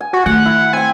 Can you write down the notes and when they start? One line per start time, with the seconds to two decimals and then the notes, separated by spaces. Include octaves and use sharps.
0.01 G#5
0.13 F#4
0.26 D#3 A3 F#5
0.45 E4
0.73 C4 G5 G#5